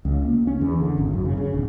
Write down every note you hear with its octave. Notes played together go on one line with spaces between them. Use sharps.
C#2
A#3
C#4
E2
D3
G#1
F#2
C#3
C#3
D1